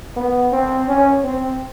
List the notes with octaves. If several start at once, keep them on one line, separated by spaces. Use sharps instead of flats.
B3
C4
C#4
C4